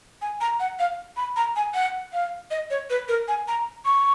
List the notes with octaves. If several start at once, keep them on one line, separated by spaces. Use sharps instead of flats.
G#5
A#5
F#5
F5
B5
A#5
G#5
F#5
F5
D#5
C#5
B4
A#4
G#5
A#5
C#6